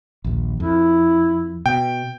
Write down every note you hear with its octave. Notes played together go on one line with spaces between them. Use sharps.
A#1 D#2
F2 E4
B2 G5